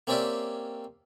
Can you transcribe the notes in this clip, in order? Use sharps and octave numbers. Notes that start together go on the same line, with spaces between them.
A#3 C4 C#4 G4 D5 E5